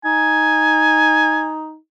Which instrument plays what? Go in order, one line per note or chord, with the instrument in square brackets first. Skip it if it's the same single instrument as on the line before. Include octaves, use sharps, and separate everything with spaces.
[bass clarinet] D#4 [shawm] G#5